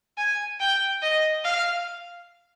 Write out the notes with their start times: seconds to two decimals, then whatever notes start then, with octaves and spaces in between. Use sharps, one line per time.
0.18 G#5
0.60 G5
1.02 D#5
1.44 F5